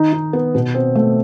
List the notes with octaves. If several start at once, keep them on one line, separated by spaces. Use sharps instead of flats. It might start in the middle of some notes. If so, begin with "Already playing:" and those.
Already playing: D#3 D#4
D#4
B3
B2
C4
A3